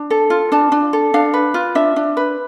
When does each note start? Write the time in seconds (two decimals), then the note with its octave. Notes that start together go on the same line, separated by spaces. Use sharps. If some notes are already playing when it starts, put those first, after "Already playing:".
Already playing: D4
0.10 A4
0.30 F4
0.52 D4 A5
0.72 D4
0.93 A4
1.14 D4 F5
1.34 B4
1.54 F4
1.75 D4 E5
1.96 D4
2.17 B4